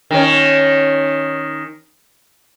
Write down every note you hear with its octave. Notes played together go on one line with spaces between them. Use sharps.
D#3 C#4